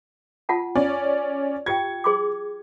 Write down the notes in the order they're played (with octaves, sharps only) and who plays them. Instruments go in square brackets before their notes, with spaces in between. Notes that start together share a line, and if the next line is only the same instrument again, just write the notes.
[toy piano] F4 F#5 A5
[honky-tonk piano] C#4 D5
[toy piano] F4 G4 G5 [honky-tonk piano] G#6 C#7
[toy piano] G#4 C6 D6